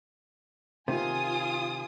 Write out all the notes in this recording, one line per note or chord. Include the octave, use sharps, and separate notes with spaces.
C3 D#3 F4 G#5 D#6